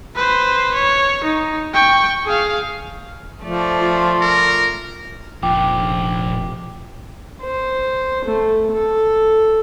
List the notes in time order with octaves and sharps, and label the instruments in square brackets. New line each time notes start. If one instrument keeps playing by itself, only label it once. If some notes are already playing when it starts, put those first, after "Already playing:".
[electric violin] B4 C5
C#5
D#4
G5 C#6
G#4 F5
[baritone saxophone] F3 [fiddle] A3 D5
[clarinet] F4
[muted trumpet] A#4
[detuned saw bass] F1 [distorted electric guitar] A#2 F3 [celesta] G5 [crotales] D6
[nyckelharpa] C5
A3
A4